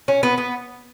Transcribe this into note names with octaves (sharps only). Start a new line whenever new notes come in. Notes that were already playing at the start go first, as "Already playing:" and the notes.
C#4
B3
B3